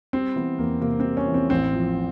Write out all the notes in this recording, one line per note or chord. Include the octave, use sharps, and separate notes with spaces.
G3 C4
E3 B3
E2 A#3
C3 A#3
G3 C4
C#4
E3
C4
A1 C4
F3